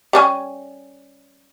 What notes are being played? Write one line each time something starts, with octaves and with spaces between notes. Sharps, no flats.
G3 C#4 G#5